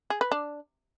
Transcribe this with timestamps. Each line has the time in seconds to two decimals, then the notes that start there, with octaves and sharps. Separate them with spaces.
0.10 G#4
0.21 B4
0.32 D4